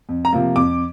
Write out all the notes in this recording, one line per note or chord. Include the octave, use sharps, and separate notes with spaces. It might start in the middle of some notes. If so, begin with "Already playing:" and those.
F2
A#5
C3 F3 A#3
F2 D6